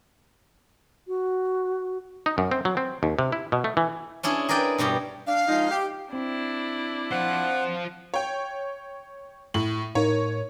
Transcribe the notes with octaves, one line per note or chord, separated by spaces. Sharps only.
F#4
D#4
F#2
C4
F#3
C4
D#2
C3
E4
B2
A3
E3
C#4 D4 E4 G#4
G#4 A#4 B4 D5 G5
G2 B2 G3 G4
D4 F5
F3 G#3 D#4
G4
C4 D4 E4
F4 C5 F#5
C#5 G5
A2 F#7
A2 D#4 A#4 C#5